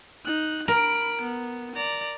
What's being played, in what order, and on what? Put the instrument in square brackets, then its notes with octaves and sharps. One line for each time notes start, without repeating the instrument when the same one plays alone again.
[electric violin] D#4 F#6
[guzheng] A#4 [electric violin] B5 D7
[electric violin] B3
D5 A#5